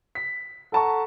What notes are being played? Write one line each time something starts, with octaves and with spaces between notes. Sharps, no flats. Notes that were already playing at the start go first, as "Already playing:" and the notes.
B6
A4 F#5 A5 A#5 C#6